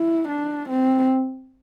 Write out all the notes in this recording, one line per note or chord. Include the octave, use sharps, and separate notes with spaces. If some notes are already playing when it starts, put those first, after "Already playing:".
Already playing: E4
D4
C4